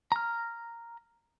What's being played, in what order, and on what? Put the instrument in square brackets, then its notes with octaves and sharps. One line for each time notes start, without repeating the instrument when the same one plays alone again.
[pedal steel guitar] A#5 F6